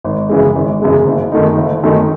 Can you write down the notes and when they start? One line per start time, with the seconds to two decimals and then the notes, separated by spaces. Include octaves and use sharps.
0.04 G#1
0.29 F#2 C#3 E3 G#3
0.56 G#1
0.82 F#2 C#3 E3 G#3
1.06 F#1
1.32 F#2 D#3 A3 D#4
1.57 F#1
1.83 F#2 D#3 A3 D#4